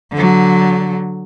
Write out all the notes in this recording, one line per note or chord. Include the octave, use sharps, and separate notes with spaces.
D3 F#3